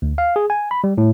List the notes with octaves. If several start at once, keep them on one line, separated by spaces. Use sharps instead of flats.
D2
F5
G#4
G#5
B5
G3
A2